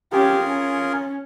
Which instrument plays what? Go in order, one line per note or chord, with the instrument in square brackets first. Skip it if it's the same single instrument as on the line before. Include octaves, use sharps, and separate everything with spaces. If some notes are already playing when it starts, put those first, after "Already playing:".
[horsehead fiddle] C#4 G4 [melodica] F4 G#4 A#4
[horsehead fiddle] C#4